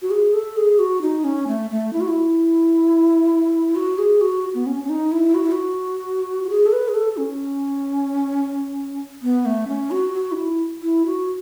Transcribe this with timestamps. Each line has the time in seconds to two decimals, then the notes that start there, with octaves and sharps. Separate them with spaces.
0.02 F#4
0.10 G#4
0.34 A4
0.57 G#4
0.79 F#4
1.02 D#4
1.24 C#4
1.48 A3
1.71 A3
1.93 E4
2.01 F#4
2.08 E4
3.76 F#4
3.98 G#4
4.21 F#4
4.54 B3
4.66 C#4
4.84 C#4
4.90 D#4
5.12 E4
5.35 F#4
5.43 E4
5.52 F#4
6.44 F#4
6.50 G#4
6.66 A4
6.73 B4
6.88 G#4
6.95 A4
7.17 C#4
9.22 B3
9.46 A3
9.68 C#4
9.91 F#4
10.14 F#4
10.32 D#4
10.37 E4
10.82 E4
11.06 F#4